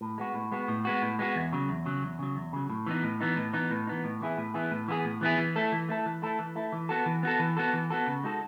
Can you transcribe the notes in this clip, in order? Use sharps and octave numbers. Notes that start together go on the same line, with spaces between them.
A2
G#3 B3 F#4
A2
G#3 B3 F#4
A2
G#3 B3 F#4
A2
G#3 B3 F#4
E2
C#3 F#3
E2
C#3 F#3
E2
C#3 F#3
E2
C#3 F#3
A2
E3 B3 D#4
A2
E3 B3 D#4
A2
E3 B3 D#4
A2
E3 B3 D#4
A2
E3 B3 E4 G#4
A2
E3 B3 E4 G#4
A2
E3 B3 E4 G#4
A2
E3 B3 E4 G#4
E3
A3 E4 A4
E3
A3 E4 A4
E3
A3 E4 A4
E3
A3 E4 A4
E3
B3 F#4 A4
E3
B3 F#4 A4
E3
B3 F#4 A4
E3
B3 F#4 A4
C#3
G#3 D#4 F#4 A4